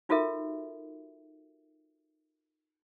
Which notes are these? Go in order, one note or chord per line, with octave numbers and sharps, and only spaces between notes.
D#4 F4 F#4 A4 A#4 E5